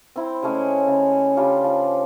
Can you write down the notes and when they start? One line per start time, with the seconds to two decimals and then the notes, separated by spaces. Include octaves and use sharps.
0.16 C4 E4
0.42 C#3 G#3 A3 C#4
0.87 C#3
1.37 C#3 G3 D4 F4
1.64 F3